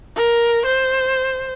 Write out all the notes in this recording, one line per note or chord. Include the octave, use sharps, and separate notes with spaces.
A#4
C5